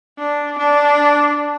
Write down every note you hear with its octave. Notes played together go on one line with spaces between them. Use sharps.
D4
D4